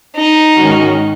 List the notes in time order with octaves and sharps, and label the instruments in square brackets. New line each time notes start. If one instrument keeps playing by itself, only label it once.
[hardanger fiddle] D#4
[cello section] G#2 D#3 G#3 C#4 F#4